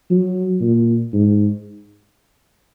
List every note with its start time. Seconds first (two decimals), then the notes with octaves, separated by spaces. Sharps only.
0.10 F#3
0.61 A#2
1.13 G#2